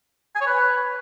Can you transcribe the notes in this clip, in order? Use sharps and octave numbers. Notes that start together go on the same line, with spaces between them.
G#5
C#5
B4